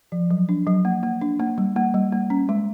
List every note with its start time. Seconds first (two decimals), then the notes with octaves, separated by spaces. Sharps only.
0.12 F3
0.30 F#3
0.49 D4
0.67 F#3
0.85 A#3
1.03 A#3
1.21 D4
1.40 A#3
1.58 G3
1.76 A#3
1.94 G3
2.12 A#3
2.30 C#4
2.49 G#3